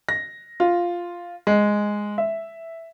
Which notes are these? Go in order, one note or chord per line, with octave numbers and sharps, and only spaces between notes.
A#6
F4
G#3
E5